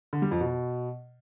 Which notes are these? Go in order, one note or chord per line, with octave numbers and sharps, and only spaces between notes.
D3
G3
F2
B2